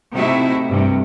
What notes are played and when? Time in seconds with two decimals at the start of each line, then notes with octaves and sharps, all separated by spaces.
0.14 C3 A3 D#4 E4 F#4 E5
0.68 G2 C3